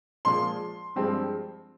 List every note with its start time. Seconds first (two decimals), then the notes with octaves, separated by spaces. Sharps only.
0.25 A#2 F3 G#3 C6
0.96 G2 F3 G#3 C4